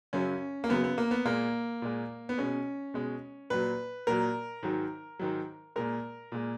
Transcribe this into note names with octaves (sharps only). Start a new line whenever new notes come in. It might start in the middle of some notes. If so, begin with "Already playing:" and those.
F#2 C#3 F#3 C#4
A#3
F#2 C#3 F#3 B3
B3
A#3
B3
A#2 G#3 A#3
A#2 G#3
B3
B2 G#3 C#4
B2 G#3
A#2 F#3 B4
A#2 F#3 A#4
G#2 D#3 F#3
G#2 D#3 F#3
A#2 G#3 A#4
A#2 G#3